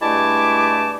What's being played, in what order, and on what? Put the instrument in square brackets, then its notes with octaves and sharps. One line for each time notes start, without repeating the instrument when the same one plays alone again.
[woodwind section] G2 G#3 A3 E4 A5 D6